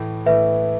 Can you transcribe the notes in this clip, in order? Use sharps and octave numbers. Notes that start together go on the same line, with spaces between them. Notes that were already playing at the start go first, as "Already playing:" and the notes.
Already playing: A2 E3 A3
A2 E3 A3 B4 E5